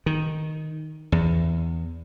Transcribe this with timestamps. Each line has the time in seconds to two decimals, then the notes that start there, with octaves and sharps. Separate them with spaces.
0.06 D#3
1.12 E2